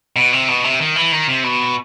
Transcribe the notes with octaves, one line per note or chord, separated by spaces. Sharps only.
B2
C3
B2
C3
D#3
E3
D#3
C3
B2